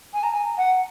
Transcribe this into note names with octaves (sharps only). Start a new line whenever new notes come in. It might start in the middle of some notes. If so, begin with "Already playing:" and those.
G#5
A#5
G#5
F#5